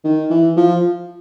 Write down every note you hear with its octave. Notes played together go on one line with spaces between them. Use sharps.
D#3
E3
F3